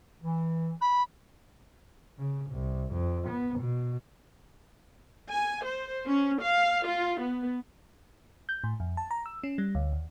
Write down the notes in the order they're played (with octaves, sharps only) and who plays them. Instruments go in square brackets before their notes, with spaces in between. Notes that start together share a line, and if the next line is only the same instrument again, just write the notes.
[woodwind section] E3
[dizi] B5
[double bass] C#3
C2
F2
B3
B2
[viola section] G#5
C5
C#4
F5
F4
B3
[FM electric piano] G6
A2
F2
A5
A#5
E6
C#4
G3
D2
D#2